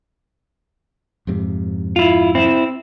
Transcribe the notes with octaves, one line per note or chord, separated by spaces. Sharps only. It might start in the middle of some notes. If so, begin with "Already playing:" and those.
F2 G#2 C3
E4 F4
C4 E4